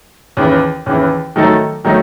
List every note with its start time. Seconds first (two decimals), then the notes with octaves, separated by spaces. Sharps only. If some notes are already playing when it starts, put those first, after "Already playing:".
0.37 D#2 C#3 E3
0.86 D#2 C#3 E3
1.36 D#3 F#3 A3 D#4 A4
1.84 D#3 F#3 A3 D#4